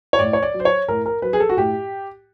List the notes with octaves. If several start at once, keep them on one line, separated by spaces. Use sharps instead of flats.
C#5
A2 D5
C#5
D5
F#3
C5
C#5
A2 A#4
A#4
F#3 B4
G#4
A4
F#4
A2 G4